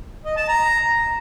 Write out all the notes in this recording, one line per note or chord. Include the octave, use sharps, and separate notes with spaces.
D#5
A5
A#5